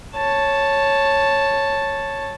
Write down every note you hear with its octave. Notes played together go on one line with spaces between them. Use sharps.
C#5 A5